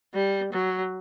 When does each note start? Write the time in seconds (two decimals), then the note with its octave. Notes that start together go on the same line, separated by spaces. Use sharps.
0.14 G3
0.53 F#3